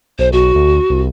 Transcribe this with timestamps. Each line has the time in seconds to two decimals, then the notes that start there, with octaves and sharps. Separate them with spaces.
0.19 B1 C5
0.33 B1 F#4
0.55 D2
0.90 C2